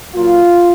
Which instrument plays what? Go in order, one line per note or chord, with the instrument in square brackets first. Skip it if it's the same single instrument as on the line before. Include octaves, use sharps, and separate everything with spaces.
[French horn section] A#2 F#3 A#3 F4